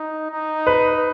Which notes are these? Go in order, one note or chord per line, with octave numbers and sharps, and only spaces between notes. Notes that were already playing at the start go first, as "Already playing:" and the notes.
Already playing: D#4
D#4
B4